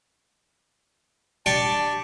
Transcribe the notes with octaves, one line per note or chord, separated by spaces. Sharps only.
D4 G4 A5 C#6